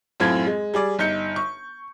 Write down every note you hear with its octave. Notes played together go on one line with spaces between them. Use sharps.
F#2 A2 C4 F4 A4 G#6
G#3
G3 G#4 D5
G1 D#4 G6 C#7
C#6